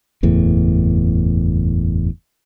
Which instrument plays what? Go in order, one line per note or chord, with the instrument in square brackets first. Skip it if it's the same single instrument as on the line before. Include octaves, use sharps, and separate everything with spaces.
[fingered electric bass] F#1 E2 A2